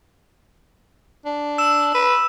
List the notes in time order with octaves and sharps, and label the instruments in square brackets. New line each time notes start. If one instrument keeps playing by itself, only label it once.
[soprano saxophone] D4
[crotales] E6 E7
[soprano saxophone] B4